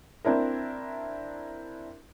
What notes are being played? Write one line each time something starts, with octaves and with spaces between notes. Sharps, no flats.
C4 D4 E4 A#4